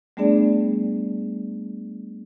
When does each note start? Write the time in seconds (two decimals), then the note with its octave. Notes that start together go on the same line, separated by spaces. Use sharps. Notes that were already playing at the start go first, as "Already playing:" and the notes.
0.17 G3 A3 B3 D4 G#4 D5